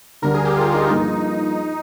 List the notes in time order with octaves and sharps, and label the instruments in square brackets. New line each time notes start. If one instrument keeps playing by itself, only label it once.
[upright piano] D2 D3 G3 D4 [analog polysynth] A#4
[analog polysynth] G#4
G4
F4
F4
D#4
[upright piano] G2 F3 A#3 F4 G#4 [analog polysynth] D#4